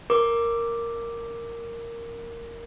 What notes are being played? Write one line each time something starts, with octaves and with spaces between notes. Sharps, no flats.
A#4 D6